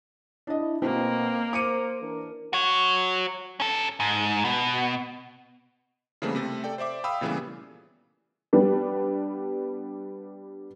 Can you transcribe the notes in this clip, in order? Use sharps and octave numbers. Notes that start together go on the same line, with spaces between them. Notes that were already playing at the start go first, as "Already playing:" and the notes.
D4 E4 D#5
B2 A#3 C4
A#4 C5 D6 C#7 D#7
E3 D4 A#4
F#4 C#5
C#4 A4
G#2
B2
C#3 E3 G3 A3 A#3 C4
C3 A3 A4
A4 D5 G5
C5 D5 E5 D6
F5 G5 B5 D#6 E6
A#2 C#3 E3 G3 A3 B3
G3 B3 D4